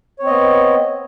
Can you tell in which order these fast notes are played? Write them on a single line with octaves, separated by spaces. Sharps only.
C#5 C4 D#5 B3